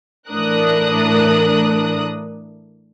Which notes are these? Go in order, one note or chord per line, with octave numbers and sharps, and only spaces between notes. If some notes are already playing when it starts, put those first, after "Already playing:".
A2 E3 D4 A#4 D#6 F#6